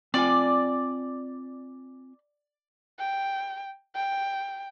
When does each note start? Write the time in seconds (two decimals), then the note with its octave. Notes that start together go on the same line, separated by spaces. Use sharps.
0.14 C4 F4 D5 G#5
2.99 G5
3.96 G5